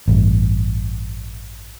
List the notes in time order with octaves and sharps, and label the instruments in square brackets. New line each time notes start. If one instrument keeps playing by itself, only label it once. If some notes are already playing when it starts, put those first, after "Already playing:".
[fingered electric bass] A1 G2